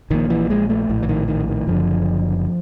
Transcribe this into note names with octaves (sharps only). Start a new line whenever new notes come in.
A#1 A#2 D#3
E3
G#3
A3
A#1 A2
E3
D#3
D#3
D#3
F#1 F#2 D3 F3